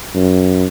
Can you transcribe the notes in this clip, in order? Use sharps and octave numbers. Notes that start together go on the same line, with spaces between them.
F#2